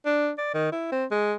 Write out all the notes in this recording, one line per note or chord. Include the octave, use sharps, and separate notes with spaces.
D4
D5
D#3
E4
C4
G#3